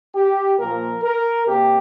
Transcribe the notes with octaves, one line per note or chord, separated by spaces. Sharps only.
G4
A#2 F3 A#3 A#4
A#4
C3 A#3 G4